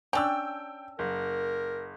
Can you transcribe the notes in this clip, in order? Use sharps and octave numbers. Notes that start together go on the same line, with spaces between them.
C#4 D4 G5 E6
F#1 A#4